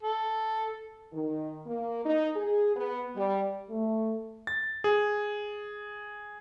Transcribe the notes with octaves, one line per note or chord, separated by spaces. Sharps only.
A4
D#3
A#3
D#4
G#4
B3
G3
A3
A6
G#4